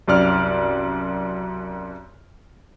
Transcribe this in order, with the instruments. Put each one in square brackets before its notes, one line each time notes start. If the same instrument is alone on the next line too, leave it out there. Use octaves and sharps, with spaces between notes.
[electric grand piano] C2 F#2 D5 F6